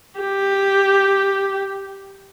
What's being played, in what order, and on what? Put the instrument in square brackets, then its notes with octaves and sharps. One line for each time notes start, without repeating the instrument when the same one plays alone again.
[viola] G4